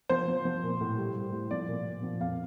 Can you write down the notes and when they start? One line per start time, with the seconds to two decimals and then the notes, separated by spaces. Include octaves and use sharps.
0.09 F3 C5
0.28 F3
0.45 F3
0.63 A#2
0.80 A2
0.98 G3
1.16 G3
1.32 A2
1.51 F3 D5
1.68 A#2
1.86 A#2
2.03 F3
2.20 F2 F5